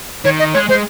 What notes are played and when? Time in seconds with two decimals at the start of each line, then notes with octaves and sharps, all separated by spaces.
0.24 D#3 C#5
0.39 D#5
0.54 G#3 C#5
0.69 G#3 C5